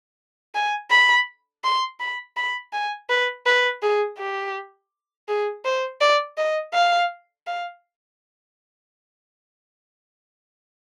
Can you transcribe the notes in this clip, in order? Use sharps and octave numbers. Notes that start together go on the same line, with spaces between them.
G#5
B5
C6
B5
B5
G#5
B4
B4
G#4
G4
G#4
C5
D5
D#5
F5
F5